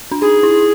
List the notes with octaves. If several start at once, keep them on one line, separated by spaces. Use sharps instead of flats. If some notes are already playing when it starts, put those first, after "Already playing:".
D4
D#4 G#4
E4